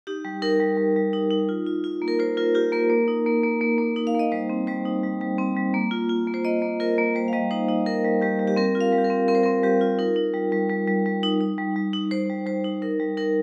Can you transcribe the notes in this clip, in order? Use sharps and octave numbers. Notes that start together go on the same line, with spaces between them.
D#4 G4
G3
D#4 A#4
G3
G3
G3
D#4
D#4
F4
F4
F4
A#3
A#4
F4 C5
F4 A#4
F4 G4
A#3 A#4
A#3
D#4
A#3
A#3
A#3
A#3
D#4
F5
A#3 D#5
G3 C5
C4
G3 C5
D#4
G3
G3
C4
G3
A#3
F4
F4
A#3
C5
A#3 D#5
A#3
F4 A#4
A#3
G3 C5
F5
G3 D#5
D#4 C5
D#4 D#5
D#4 A#4
G3
G3 G4
G3
G4
C4 A#4
F4
F5
G3
G4
A#4
C4
C4 A#4
C5
C4 A#4
G3 G4
F4
D#4 A#4
D#4
G3
G3
G3
G3
G3
D#4
D#4
G3
G3
D#4
D#4 C5
G3
G3 C5
D#4
D#4 A#4
G3
D#4 A#4